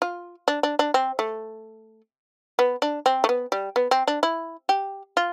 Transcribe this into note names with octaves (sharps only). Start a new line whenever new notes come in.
F4
D4
D4
D4
C4
A3
B3
D4
C4
A3
B3
G3
B3
C4
D4
E4
G4
F4